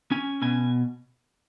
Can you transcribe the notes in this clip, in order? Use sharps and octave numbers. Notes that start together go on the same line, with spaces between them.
C#4 G#5
B2 G#5